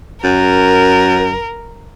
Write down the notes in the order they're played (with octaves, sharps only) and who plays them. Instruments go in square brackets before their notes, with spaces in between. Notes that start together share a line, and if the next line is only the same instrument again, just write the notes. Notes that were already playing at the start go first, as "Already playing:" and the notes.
[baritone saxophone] F#2 [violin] A#4